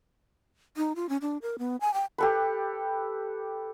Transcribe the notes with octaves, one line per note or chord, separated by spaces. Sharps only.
D#4
F4
C#4
D4
A#4
B3
G#5
G5
G4 A4 B4